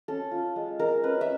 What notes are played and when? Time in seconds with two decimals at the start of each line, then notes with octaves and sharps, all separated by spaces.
0.08 C#4 A4
0.31 F4
0.56 G#3
0.79 G#3 A#4
1.03 C#4 B4
1.21 E5